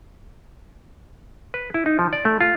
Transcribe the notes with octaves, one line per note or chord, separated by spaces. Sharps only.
B4
E4
D#4
F3
D5
A3
F4